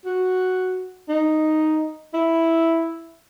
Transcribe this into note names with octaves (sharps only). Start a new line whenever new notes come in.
F#4
D#4
E4